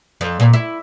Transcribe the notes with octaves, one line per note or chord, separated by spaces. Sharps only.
F2
A#2
E4